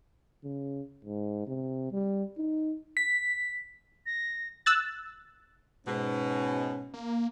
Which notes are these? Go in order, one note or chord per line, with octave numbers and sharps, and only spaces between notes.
C#3
G#2
C3
G3
D#4
B6
A#6
E6 F#6 A6
G#2 B2 C#4
A#3